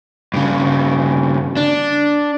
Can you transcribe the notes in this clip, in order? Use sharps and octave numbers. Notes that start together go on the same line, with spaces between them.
G2 C#3
D4